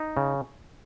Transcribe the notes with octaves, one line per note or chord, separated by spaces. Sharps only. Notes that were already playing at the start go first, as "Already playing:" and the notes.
Already playing: D#4
C#3